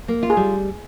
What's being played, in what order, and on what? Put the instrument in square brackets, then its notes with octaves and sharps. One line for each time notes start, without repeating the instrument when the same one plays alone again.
[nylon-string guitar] A#3
F4
[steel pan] G#4
[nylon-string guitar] G3